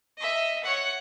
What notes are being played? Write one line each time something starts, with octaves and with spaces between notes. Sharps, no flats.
D#5 E5
C#5 F#5